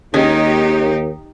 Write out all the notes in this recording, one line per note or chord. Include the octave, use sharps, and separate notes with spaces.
D#2 D#3 G#3 C#4 D#4 G4